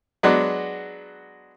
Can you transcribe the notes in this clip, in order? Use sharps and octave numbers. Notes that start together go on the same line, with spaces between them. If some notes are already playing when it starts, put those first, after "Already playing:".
F#3 G#3 B3 D4